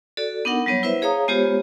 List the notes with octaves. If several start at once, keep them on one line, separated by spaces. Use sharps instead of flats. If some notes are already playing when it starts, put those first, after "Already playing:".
F#4 A4 D5
B3 D4 D#4 A#4 F#5
F#3 G3 B3 C#5
E4 B4 C5 E5
G#4 C#5 F5 A#5 D#6
G#3 B3 F4 G4 C5 C#5